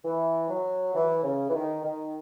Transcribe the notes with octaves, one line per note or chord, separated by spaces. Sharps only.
E3
F#3
E3
C#3
E3
D#3
D#3